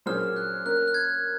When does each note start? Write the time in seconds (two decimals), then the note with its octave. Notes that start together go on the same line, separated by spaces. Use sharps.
0.06 A#2 F#3 C#4 G#4 C5 F6
0.36 F#6
0.65 A#3 C#4 F#4 A#4 F#6
0.88 F#6
0.94 G#6